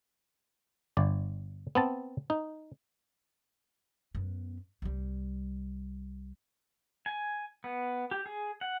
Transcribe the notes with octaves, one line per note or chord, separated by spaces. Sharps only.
G1 D5
B3 C4 A5
D#4
F#2 B3
C2 G3
G#5
B3
G4
G#4
F#5